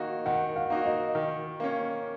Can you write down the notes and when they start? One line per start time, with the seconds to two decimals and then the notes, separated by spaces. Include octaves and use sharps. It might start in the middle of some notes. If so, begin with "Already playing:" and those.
Already playing: D#3 A#3 D#4 F#4
0.26 D#3 F#5
0.56 F5
0.70 A#3 D#4 F#4
0.86 D#5
1.15 D#3
1.60 A#3 C#4